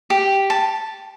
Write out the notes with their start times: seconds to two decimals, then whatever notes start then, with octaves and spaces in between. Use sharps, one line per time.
0.10 G4
0.50 A5